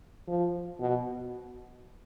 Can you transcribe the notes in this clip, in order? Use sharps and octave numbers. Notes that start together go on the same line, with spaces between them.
F3
B2